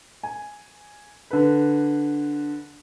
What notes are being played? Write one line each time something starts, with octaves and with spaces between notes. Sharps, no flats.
G#5
D3 B4